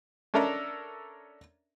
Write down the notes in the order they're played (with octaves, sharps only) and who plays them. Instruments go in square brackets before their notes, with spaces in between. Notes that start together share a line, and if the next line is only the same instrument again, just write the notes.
[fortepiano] C#4 D4 A4 A#4 E5 A#5